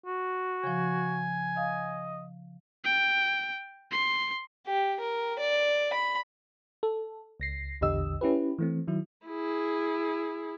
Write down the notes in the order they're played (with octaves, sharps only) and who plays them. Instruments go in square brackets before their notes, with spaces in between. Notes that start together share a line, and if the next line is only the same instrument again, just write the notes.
[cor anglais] F#4
[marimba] C#3 F3 [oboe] G#5
[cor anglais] D#5 [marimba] F5
[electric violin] G5
C6
[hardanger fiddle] G4
A#4
D5
B5
[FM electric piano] A4
C#2 A#6 C7
A#1 E2 D3 G4 D#5 E6
C#4 E4 G4 B4
E3 A3 C4
D#3 F#3 E4
[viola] E4 G#4